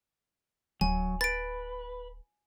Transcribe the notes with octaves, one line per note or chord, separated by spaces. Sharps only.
D1 F#3 G#5
B4 A6 D7